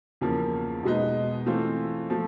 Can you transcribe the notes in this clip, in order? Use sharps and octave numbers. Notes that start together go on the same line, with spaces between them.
E2 C#3 F3 A#3
B2 G#3 B3 D#4
E3 A3 C4 F4
F3 A3